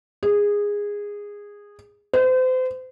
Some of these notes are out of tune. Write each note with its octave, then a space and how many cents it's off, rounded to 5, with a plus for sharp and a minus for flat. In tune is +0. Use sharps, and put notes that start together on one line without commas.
G#4 -15
C5 -35